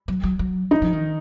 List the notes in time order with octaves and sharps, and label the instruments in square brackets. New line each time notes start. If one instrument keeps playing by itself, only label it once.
[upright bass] F#3
F#3
F#3
[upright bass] F3 [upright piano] D#4
[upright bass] F3
D#3